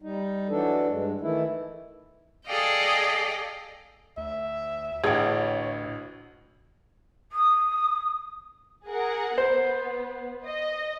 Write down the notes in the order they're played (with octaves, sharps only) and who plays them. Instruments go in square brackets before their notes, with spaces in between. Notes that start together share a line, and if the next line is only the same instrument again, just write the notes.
[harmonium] G3 D#4
E3 F#3 D4 A4
G2 G#3
D#3 E3 A3 E4
[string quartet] G#4 A4 D5 D#5 F5 G5
[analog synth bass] D2 [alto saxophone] E5
[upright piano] A1 D2 G#6 [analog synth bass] A2 [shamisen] G#4 G5 [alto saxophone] C#5
[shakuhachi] D#6
[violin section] G#4 A#4 F#5
[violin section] B3 [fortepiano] C5
[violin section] D#5